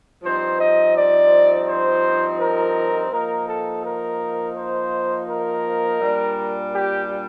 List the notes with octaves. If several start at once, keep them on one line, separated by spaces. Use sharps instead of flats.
G2 F3 C4 D#4 C5
D#5
D5
C5
A#4
F3 A#3 D#4 A#4
A4
A#4
C5
A#4
A#2 G3 D4
G4